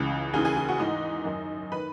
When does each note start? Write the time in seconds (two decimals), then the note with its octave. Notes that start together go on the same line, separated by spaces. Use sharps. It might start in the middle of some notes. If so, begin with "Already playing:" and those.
Already playing: C#2 C#3 E3
0.33 D#2 C#3 E3 G#4 G#5
0.45 G#4 G#5
0.57 G#4 G#5
0.68 F#4 F#5
0.79 G#2 E3 D#4 D#5
1.25 F#2 D#3
1.72 D#3 B4 B5